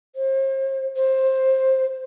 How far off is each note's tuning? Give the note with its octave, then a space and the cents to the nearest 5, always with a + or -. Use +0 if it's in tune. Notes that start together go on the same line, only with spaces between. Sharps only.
C5 +40
C5 +15